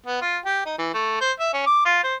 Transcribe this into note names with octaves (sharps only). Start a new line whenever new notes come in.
B3
F4
G4
D#4
E3
A3
C5
E5
C#4
D6
F4
C5